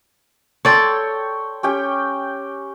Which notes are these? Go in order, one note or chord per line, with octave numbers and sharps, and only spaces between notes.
A4 C#5 D5 G5 C6
C#4 G4 G5